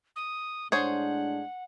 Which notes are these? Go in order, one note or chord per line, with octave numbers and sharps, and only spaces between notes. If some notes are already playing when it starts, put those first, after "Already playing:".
D#6
A2 G#3 D4 G#4 C5 C#5 F#5